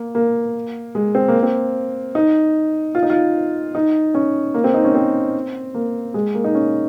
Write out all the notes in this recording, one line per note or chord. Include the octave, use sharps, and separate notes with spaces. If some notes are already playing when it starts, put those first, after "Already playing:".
Already playing: A#3
A#3
G#3
C4
A#3
C4
D#4
F4
D#4
F4
D#4
C#4
A#3
C4
D#4
C#4
C4
A#3
G#3
A#3
D#4
C#4